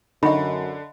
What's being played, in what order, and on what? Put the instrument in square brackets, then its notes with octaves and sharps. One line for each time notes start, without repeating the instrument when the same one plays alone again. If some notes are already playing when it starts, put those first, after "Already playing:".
[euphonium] F#2 [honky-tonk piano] D3 [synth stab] D#4 F#4 [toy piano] D#5 E5 B5